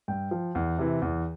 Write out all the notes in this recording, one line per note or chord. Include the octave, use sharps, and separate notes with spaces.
G2 G5
F3
E2
C3 E3
E2